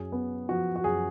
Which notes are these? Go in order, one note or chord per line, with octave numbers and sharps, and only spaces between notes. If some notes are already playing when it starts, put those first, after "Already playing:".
Already playing: F#2 G#4
B3
F3 F#4
F#4
F#2 G#4